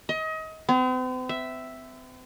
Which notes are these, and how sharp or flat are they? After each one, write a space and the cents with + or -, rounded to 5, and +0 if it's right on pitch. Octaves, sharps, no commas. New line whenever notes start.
D#5 +30
C4 -45
E5 +0